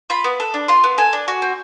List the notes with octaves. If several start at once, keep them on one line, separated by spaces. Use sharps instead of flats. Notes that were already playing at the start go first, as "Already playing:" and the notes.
F4 B5
B3
A4
D4
F4 C6
B3
A4 G#5
D4
F#4
C4